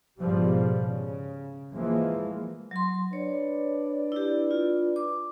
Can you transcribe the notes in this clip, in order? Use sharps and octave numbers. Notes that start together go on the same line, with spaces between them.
G#2 B2 D3 F3 G3
C#3
E3 F3 G#3 A#3
F#3 C6
D4 B4 C#5 D5
E4 G4
F4
D6